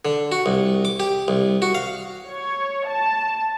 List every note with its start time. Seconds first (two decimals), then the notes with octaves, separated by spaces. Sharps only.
0.05 D3
0.32 F#4
0.46 C2
0.85 D6
1.00 G4
1.28 C2
1.62 F#4
1.75 F5
2.29 C#5
2.88 A5